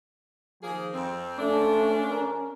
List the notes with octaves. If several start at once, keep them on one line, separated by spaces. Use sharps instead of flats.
D#3 F3 A#3 G#4
F2 C4
F3 G#3 A3 C#4 D4
A#4